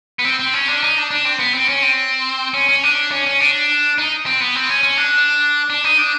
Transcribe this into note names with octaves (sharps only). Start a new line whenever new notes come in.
B3
C4
C4
C#4
D4
D#4
D4
D4
C4
B3
C4
C#4
C4
C#4
C#4
D4
C#4
C#4
D4
D#4
C4
B3
C4
C#4
C#4
D4
D4
D#4
D4